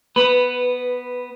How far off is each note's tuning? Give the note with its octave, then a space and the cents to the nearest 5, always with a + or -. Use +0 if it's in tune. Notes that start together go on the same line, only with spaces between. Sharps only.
B3 +0 B4 +10